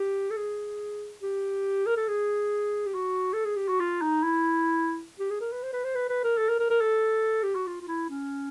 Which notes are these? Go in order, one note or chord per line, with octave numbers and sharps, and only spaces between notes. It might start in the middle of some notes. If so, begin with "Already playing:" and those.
Already playing: G4
A4
G#4
G4
A#4
A4
G#4
G4
F#4
A4
G#4
G4
F#4
F4
D#4
E4
G4
G#4
A#4
B4
C5
B4
C5
B4
B4
A#4
A4
A#4
A#4
A#4
A4
G4
F#4
F4
F4
E4
C#4